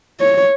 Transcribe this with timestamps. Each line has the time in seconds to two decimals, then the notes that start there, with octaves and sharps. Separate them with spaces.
0.20 C#5